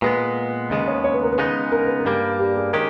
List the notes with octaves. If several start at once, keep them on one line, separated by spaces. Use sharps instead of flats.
A#2 G#3 B3 B4
D#2 C#3 G#3 B3 D#5
C#5
C#5
B4
A#4
B4
C#3 G#3 B3 D#4
A#4
B4
A#4
G2 G3 A#3
G4
G#4
D#3 G#3 C#4 G4 A#4